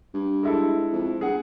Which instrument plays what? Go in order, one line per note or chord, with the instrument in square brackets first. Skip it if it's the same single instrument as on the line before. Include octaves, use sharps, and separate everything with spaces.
[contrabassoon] G2
[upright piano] G#3 E4 A4
[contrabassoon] F2
[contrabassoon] G1 [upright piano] G#4 F#5